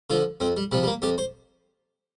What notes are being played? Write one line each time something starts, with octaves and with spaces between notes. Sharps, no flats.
D3 F3 F4
F2 C4
G3
C3 F3 G3
G3
A#3
F2 G4
C5